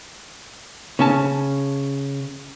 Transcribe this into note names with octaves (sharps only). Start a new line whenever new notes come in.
C#3 C#4 A5